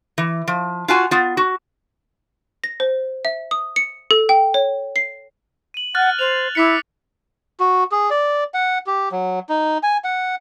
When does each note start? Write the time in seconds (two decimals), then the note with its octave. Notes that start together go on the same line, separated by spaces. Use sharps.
0.18 E3
0.48 F3
0.88 F4 F#4 G#5
1.11 B3 F4
1.37 F#4
2.64 A#6
2.80 C5
3.25 E5
3.51 D#6
3.76 C#7
4.11 A4
4.29 G5
4.54 C#5
4.96 C7
5.74 D#7 F#7
5.95 F#5 F6 F#6 A6
6.19 C5 F7
6.55 E4 D6 B6 C#7
7.60 F#4
7.92 G#4
8.11 D5
8.54 F#5
8.87 G4
9.12 F#3
9.49 D#4
9.83 G#5
10.04 F#5